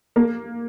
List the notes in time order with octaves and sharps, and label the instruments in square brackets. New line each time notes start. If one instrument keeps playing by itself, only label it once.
[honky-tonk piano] A#3